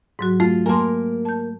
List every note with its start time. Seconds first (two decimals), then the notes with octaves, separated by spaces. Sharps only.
0.19 G#2 F#3 F#4
0.40 A3 F4
0.66 A#3 A#4 G#5 A5 C6
1.25 A5 G6